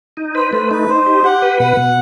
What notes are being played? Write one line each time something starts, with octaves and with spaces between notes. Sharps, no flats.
D#4
B4 C5
A3 C5
D#4 B4
D#4 C5
G4
G4 F#5
B4
B2 F#5
B2